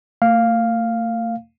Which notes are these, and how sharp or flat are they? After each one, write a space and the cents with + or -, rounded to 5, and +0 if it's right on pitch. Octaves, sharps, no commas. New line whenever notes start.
A3 +45 F5 +0